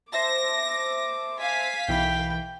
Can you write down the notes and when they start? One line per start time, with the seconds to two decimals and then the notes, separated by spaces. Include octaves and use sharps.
0.13 C5 E5 A5 D6 A#6
1.40 F5 G#5 B6
1.88 B1 E3 G5 B5